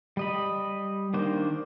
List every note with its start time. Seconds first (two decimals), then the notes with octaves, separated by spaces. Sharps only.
0.17 G3 D#5 B5
1.14 D#3 A#3 D4 C5